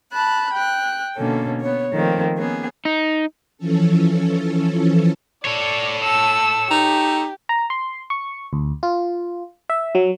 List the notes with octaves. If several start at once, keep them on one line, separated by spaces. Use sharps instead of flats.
A5 B5 F#6
G5 F#6
B2 D3 A#3 C#4 A4
B3 C#5
D#3 F3 A3 A#3 C4
A#3 B3 C#4 G#4
D#4
E3 F3 C#4 A4
A4 C#5 D5
A5 E6
D#4 G4
A#5
C6
C#6
D2
F4
E5
F#3